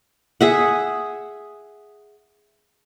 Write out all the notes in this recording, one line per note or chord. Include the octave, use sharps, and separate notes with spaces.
G#4 E5 F#5